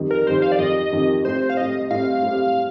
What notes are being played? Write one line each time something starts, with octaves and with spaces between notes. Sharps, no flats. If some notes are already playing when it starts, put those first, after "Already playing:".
Already playing: F2 D#3 G3
A#4
F2 D#3 G3 C5
F5
D5
F2 D#3 G3 D#5
F2 D#3 G3
A2 G3 C4 C5
F5
A2 G3 C4 D#5
A2 G3 C4 F5
A2 G3 C4